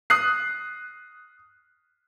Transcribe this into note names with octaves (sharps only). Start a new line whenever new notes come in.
D#6 F#6 C7